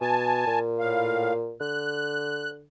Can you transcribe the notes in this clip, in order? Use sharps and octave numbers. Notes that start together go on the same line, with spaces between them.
B2 G#5 A5
A#2
A2 F5
D3 F#6